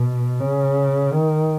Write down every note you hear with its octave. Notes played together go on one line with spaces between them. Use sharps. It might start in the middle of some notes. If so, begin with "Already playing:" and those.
Already playing: B2
C#3
D#3